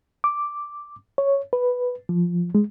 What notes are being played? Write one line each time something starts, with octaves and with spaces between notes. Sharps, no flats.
D6
C#5
B4
F3
G#3